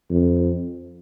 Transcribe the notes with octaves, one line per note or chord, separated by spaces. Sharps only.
F2